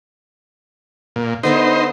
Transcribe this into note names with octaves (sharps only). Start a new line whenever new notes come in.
A#2
D3 B3 D#4 C5 E5